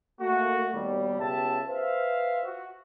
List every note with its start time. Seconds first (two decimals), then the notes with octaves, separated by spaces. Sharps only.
0.21 A3 A#3 F#4
0.73 D#2 B2 G3
1.19 C#2 C#3 B3 G4 E5 A5
1.67 B4 C5 E5 F5
2.45 F#4